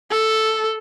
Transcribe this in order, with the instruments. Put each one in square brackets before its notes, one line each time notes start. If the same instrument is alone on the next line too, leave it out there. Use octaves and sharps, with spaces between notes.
[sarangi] A4